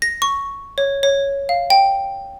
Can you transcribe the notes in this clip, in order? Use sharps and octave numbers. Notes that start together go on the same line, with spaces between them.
A#6
C#6
C#5
C#5
F5
G5